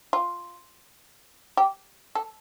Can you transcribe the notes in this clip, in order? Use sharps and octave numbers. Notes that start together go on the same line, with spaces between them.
F4
G4
A4